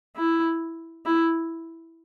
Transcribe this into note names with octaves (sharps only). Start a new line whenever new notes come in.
E4
E4